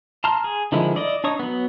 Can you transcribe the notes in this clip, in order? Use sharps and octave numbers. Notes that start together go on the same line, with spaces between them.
A5 A#5 C6 F6
G#4
D3 D#3 F3 G#3 E4
E4 D5 D#5
D4 D#4 C#5 C#6 D#6
F#3 B3